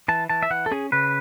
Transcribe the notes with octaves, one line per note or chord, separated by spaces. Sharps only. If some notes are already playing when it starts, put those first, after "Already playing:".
E3 A5
E3 A5
E5
E3 F#5
A4
C#4 G#4
C#3 B4